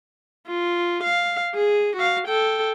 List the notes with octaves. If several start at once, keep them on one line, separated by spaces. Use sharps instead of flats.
F4
F5
G#4
F#4 F5
A4 G5